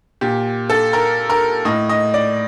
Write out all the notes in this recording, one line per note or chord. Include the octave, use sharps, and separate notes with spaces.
A#2 G4
A4
A#4
A#4
A2 D#5
D#5
D5